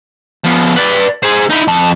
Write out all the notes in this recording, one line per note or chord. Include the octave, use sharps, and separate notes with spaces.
F3 B3
B4 D5
G#4 C5
D#4 E4
F2 A5